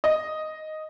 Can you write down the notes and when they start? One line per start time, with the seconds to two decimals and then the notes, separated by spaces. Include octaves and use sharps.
0.04 D#5